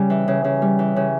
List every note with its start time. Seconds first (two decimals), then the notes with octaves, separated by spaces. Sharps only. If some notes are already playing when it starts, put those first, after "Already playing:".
Already playing: C#3 G3
0.10 E3
0.28 C#3
0.44 C#3
0.62 G3
0.79 E3
0.96 C#3